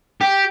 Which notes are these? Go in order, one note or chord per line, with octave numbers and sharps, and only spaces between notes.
G4